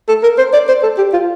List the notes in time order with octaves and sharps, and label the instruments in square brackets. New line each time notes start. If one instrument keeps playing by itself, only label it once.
[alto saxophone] A4
A#4
C5
D5
C5
A4
G4
F4